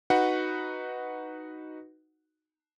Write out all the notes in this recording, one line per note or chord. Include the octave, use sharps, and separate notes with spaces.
D#4 F#4 B4 F#5